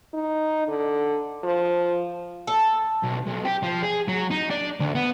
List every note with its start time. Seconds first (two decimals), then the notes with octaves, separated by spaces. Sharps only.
0.14 D#4
0.68 D3
1.44 F3
2.47 A4
3.04 B1
3.27 B1
3.45 G4
3.63 F3
3.83 G#4
4.08 F#3
4.31 D#4
4.50 D4
4.80 D2
4.95 B3